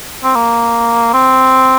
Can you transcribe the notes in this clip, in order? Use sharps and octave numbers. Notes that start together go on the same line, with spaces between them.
C4
A#3
C4